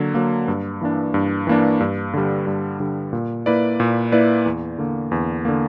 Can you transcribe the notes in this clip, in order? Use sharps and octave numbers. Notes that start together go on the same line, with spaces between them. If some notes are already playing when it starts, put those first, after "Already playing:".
Already playing: D3 F#3 A#3
F#3 A#3
G2
E3 A#3 D4
G2
E3 A#3 D4
G2
D3 G3
G2
D3 G3
A#2
A#3 E4 B4 D5
A#2
A#3 E4 B4 D5
E2
D3 A#3
E2
D3 A#3